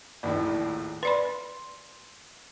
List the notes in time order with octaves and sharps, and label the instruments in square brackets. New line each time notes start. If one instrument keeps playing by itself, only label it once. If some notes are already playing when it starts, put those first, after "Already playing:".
[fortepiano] A#1 D#2 A2
[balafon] B4 D5 B5 [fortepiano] C6